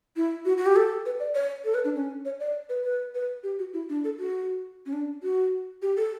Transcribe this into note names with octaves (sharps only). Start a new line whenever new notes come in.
E4
F#4
F#4
G4
A4
B4
D5
C#5
A4
B4
D4
C#4
C#5
D5
B4
B4
B4
G4
F#4
E4
D4
A4
F#4
C#4
D4
F#4
G4
A4